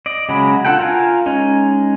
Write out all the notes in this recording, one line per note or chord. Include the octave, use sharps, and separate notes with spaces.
D5 D#5
C#3 F#3 G#3 B5
D4 F4 A4 F#5 G5
F4 A#4 F5 G#5
G#3 C#4 D#4